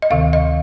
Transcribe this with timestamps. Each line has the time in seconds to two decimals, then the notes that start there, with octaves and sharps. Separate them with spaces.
0.02 D#5
0.10 D2 C3 D#3 F5
0.33 D#5